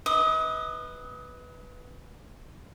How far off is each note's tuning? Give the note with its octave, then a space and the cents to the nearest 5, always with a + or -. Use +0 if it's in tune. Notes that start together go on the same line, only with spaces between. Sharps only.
B4 +0 D#5 +40 D#6 -30